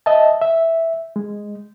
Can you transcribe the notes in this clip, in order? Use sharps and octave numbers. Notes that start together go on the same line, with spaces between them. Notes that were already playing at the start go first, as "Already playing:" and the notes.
D#5 E5 A5
E5
G#3